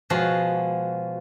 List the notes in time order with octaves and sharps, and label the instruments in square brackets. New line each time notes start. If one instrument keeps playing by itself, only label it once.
[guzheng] B2 F3 G#3 F#4